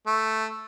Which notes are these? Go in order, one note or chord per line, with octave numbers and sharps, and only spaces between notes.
A3